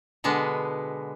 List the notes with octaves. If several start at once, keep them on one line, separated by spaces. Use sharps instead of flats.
B2 D3 G#3 B3